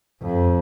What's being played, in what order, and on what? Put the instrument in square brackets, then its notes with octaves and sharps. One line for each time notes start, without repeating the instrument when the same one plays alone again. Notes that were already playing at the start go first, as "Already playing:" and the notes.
[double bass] F2